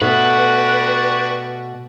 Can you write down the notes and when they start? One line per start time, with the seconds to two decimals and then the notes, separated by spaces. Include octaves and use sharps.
0.01 B2 A3 D4 F#4 G4 B4 F#6